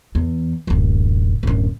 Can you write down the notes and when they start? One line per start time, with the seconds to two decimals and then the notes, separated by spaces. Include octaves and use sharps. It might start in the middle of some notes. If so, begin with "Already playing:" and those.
0.15 E2
0.67 D1 F#2
1.43 D1 F#2